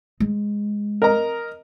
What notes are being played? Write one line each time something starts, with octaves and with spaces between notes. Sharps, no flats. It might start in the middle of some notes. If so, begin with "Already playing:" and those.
G#3
A#4 D#5 A#5